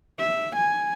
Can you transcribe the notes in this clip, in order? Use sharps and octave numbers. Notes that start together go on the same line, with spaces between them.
E5
G#5